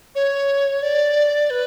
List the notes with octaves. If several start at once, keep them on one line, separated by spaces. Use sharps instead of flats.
C#5
D5
B4